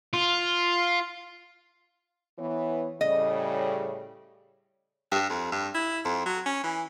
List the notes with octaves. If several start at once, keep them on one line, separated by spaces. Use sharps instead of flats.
F4
E3 B3 C#5
A2 C#3 G3 D#5
G2
F2
G2
E4
F2
F#3
C#4
E3